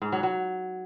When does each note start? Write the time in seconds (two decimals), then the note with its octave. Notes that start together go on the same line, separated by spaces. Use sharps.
0.02 G#2
0.12 F#3
0.23 F#3